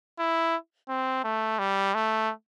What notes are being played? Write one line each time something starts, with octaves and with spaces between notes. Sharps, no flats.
E4
C4
A3
G3
A3